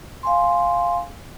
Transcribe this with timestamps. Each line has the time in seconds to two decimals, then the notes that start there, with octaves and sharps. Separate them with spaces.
0.23 F5 G#5 C6